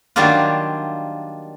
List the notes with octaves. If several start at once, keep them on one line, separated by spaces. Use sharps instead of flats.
D#3 F#3 G3 A#3 D4 F4